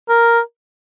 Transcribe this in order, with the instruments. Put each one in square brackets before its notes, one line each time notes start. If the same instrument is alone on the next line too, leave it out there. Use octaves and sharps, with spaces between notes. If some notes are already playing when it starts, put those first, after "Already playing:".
[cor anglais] A#4